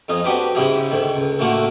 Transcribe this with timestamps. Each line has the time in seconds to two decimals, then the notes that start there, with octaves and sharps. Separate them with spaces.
0.08 F2 D#4 F4 D#5 G#5
0.24 C4 D4 F#4 G4 B4 C5
0.55 G#2 C#3 G#3 E4 G4 G#4
0.90 D2 G#2 D#3
1.16 C#2
1.39 A2 D3 A3 A#3 F4 F#4